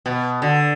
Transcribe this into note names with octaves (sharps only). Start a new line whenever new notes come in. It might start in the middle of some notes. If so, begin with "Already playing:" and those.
B2
D3